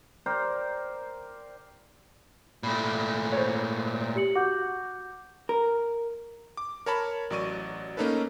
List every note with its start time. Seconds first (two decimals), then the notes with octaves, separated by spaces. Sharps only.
0.26 A#4 C5 D5 G5
2.63 A#2 A3 B5
3.32 C5 C#5
4.16 G4 C#7 F#7
4.35 F#4 D6 G6
5.49 A#4
6.57 D6
6.86 A#4 C#5 A5 B5
7.30 A1 F#3 D5 C#6 D#7
7.97 A3 A#3 C#4 D#4 A4 B4